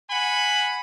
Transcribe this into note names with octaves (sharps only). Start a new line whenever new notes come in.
F#5 G#5 B5